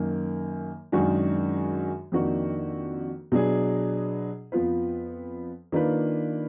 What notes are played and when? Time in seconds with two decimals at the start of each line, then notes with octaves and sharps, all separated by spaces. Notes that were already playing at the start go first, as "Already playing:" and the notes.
Already playing: F#2 D#3 A#3
0.92 F#2 D#3 G#3 D4 F#4
2.12 F2 D#3 A#3 D4 F#4
3.32 B2 F#3 D4 G#4
4.52 F2 F3 B3 F4 B4
5.72 D#3 A#3 D4 F4 B4